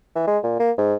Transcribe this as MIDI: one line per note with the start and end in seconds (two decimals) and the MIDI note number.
0.15 0.25 52
0.27 0.38 56
0.44 0.56 46
0.59 0.71 58
0.78 0.94 44